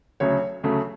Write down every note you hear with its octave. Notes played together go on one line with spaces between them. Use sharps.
D2 C#3 F#3 A3 C#5
D2 C#3 F#3 A3